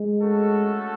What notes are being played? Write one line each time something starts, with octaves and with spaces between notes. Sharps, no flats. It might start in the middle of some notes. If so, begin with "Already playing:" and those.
Already playing: G#3
A3 C#4 F#4 A4